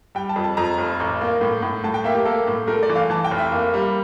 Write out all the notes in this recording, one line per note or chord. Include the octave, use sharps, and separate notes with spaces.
G3 G5
A5
F2
A5
F2 A#5
F1
A1
A#3
A2
A2
A2 A5
G5
A#3 E5
G4
A#3 A4
A2
A3 A#4
D5
E3
F5
E3 A5
G5
F1
E5
A#3
G3